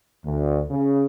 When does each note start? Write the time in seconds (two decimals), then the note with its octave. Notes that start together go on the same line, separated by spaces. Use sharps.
0.24 D2
0.70 C#3